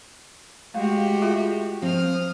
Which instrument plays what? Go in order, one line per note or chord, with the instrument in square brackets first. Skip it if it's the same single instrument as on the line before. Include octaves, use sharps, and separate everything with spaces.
[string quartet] G#3 F#4 G4 [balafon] A3 F5
[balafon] F4 G#4 E5
[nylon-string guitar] F3 C4 [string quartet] D#6 F6